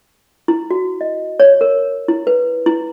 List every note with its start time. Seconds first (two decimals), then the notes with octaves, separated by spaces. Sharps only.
0.48 E4
0.71 F#4
1.01 D#5
1.40 C#5
1.61 A#4
2.08 E4
2.27 B4
2.66 E4